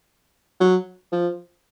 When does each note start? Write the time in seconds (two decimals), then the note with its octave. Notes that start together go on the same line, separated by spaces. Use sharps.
0.61 F#3
1.12 F3